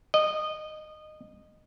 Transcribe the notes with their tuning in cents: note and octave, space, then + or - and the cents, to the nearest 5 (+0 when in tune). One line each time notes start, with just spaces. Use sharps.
D#5 -20